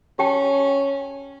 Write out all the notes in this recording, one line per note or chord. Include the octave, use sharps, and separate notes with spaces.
C#4 G4 G5 A5